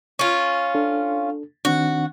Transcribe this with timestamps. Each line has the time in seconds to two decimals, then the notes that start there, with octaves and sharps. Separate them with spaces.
0.19 C#4 F4
0.74 D4 A4
1.65 D#3 C4 D4 F#4